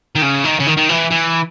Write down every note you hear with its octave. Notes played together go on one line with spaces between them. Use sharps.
D#3
C#3
D#3
C#3
D#3
D#3
E3
E3